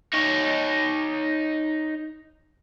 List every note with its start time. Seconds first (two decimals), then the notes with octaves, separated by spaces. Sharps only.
0.14 D#4 C#5